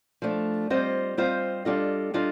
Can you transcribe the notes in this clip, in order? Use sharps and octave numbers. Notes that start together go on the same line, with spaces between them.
F3 A3 D4
G3 C4 F4 C5 D#5
G3 C4 F4 C5 D#5
G3 D4 F4 A4 D#5
G3 D4 F4 A4 D#5